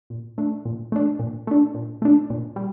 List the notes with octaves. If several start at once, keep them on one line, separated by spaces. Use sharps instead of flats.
A#2
A3 D4
A#2
A3 D4
A#2
A3 D4
A#2
A3 D4
A#2
G3